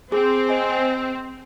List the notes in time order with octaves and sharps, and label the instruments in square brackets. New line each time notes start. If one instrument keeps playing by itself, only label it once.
[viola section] C4 [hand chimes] G#4
[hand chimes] C5 D#5 G#5